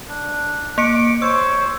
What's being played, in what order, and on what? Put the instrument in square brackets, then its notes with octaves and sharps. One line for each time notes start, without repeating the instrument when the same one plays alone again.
[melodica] D4
[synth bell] A#3 C#7 D7 [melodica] D6
[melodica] C5 C#5 [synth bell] E6